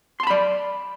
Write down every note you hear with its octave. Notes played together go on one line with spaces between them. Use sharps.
D5 A5 B5 C6